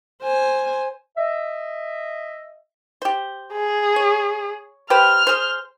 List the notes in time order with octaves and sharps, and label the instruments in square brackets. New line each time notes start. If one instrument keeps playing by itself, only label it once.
[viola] C5 G#5
[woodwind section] D#5 E5
[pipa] G4 C5
[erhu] G#4
[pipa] C#5
[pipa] G4 B4 C5 [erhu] F6
[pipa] G#4 C5